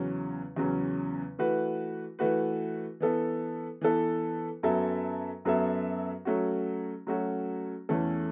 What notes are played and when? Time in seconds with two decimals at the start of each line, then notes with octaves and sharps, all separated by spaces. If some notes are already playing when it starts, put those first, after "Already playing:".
Already playing: E2 C#3 F#3 C#4
0.56 E2 C#3 F#3 C#4
1.39 E3 A3 F#4 B4
2.19 E3 A3 F#4 B4
3.00 E3 B3 A4
3.81 E3 B3 A4
4.63 F#2 F#3 B3 A4 E5
5.45 F#2 F#3 B3 A4 E5
6.25 F#3 A3 C#4 F#4
7.07 F#3 A3 C#4 F#4
7.89 E2 E3 A3 C#4 A4